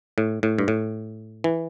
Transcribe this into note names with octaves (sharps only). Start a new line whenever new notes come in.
A2
A2
G2
A2
E3